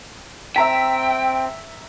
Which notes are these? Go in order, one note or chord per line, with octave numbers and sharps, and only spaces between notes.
C4 E5 G5 A#5 B6